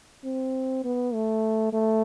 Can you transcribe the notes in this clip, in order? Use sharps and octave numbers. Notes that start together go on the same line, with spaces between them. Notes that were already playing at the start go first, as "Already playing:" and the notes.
C4
B3
A3
A3